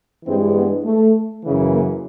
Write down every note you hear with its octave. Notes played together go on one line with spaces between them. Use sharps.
G2 E3 G#3 C4
B3
A3
F#2 C#3 E3
A#3